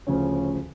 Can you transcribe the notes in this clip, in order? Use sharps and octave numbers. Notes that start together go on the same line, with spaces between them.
D2 C#3 F3 C#4